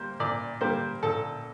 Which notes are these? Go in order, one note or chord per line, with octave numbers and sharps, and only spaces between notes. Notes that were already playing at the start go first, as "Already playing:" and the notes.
Already playing: G3 A#3 C5
A#2 D5
G3 A#3 C5
A#2 A4